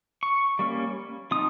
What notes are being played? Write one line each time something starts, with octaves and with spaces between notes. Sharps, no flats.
C#6
G3 A#3 C#4
F3 C4 D#4 D#6